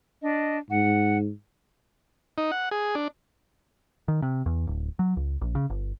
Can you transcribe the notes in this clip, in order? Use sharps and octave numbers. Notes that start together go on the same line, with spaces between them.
D4 D#5
G#2 F#5
D#4
F#5
G#4
D4
D#3
C3
E2
D1
F#3
C#2
A#1
C#3
G1